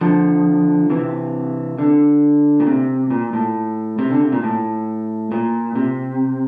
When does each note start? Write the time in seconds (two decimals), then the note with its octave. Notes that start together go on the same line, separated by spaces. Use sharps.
0.01 D3 F3
0.90 C3 E3
1.79 D3
2.60 A#2
2.67 C3
3.10 A#2
3.33 A2
3.99 C3
4.10 D3
4.21 C3
4.32 A#2
4.43 A2
5.32 A#2
5.75 C3